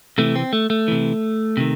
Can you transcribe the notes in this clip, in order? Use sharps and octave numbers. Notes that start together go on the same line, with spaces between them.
C3 E3 A3
C4
A3
A3
C3 E3
C3 D#3